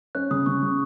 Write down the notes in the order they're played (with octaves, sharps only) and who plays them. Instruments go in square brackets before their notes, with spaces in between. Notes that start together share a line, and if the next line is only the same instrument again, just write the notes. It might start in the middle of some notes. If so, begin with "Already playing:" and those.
[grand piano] C#4 [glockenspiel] F#6
[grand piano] C#3 [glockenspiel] D#6
[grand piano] C#3 [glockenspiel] C#6
[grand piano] C#3